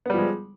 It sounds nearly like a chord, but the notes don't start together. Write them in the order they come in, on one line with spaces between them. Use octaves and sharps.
B3 G3 F3 G#3